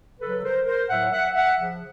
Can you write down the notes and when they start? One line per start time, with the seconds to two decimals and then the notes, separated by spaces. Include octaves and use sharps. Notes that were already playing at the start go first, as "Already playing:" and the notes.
0.20 C#3 F#3 A4 B4
0.43 A#4 C5
0.66 A#4 C5
0.89 A2 F#3 E5 F#5
1.12 E5 F#5
1.34 E5 F#5
1.58 C#3 F3